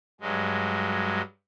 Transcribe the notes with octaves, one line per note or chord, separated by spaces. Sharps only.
G2 F#3 G#3